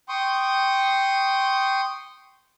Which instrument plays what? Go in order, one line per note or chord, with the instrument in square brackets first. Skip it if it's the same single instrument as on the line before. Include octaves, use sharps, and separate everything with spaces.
[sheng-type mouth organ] G5 C6 C#6 D#6